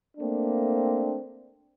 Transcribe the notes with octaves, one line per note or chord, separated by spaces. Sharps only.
A3 A#3 C4 D4